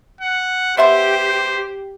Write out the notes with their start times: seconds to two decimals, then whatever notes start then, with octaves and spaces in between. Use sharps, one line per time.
0.21 F#5
0.77 B3 G4 C5 E5 C6